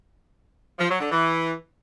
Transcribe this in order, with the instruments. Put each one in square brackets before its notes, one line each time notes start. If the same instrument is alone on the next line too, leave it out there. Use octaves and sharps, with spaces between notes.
[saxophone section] F3
F#3
D3
E3